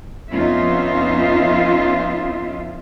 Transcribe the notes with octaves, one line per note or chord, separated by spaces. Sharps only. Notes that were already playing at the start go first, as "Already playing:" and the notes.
F2 B3 C#4 D#4 F4 E5